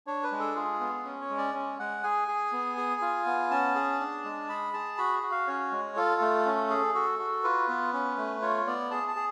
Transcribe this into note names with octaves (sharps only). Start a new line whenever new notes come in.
D4 C#5
B4
G#3
A4
F4 G#4
B3
C#4
C#5
G#3
D5
C#4
G#3 F#5
G#4 G#5
G#4
B3
G#4
F4
B3
C#4 A5
G#4
D4
G#3
G#4 B5
G#4 A5
F#4 B5
F#4
F5
C#4 C#5
G#3
F4 A4
A3
C#4
G#4
F#4 A4
F#4
F4 B4
B3
C#4
A3
F4 C#5
B3 D5
G#4 A5
A5
G#4